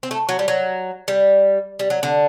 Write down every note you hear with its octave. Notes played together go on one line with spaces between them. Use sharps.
C4
A3
F#3
G3
F#3
G3
G3
F#3
D3